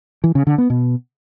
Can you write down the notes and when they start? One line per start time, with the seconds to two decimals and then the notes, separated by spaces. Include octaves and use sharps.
0.24 E3
0.35 C#3
0.47 D3
0.58 B3
0.70 B2